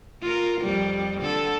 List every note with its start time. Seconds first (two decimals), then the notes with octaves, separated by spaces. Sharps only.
0.22 F4 A#4
0.61 F2 G3
1.21 D3 A4